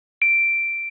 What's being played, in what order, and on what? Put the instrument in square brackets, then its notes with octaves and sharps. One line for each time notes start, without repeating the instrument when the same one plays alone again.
[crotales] D7